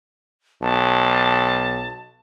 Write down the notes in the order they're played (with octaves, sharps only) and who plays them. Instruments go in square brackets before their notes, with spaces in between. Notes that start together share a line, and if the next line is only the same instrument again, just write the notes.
[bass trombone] B1 [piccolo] A5